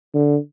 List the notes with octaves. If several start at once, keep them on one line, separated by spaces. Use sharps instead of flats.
D3